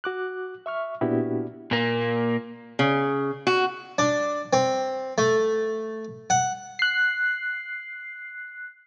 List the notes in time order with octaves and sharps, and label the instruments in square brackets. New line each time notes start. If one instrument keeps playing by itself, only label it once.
[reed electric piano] F#4 D6 F#6
E5 C#6 F6
A#2 B3 D4 E4 F#4 G4
[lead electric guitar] A#2 A#3
[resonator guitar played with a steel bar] C#3
F#4
[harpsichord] D4
C4
A3
F#5
[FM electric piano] F#6 C7